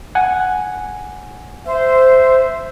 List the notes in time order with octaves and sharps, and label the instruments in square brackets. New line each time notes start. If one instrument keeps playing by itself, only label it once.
[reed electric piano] F#5 G#5
[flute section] C5 [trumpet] E5